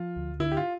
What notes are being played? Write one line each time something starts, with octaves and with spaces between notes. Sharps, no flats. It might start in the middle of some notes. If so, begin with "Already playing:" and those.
Already playing: F3 F4
D2
D3 E4
G4
F4